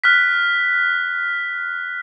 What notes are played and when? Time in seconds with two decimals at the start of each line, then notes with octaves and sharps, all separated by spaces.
0.04 F6 F#6 B6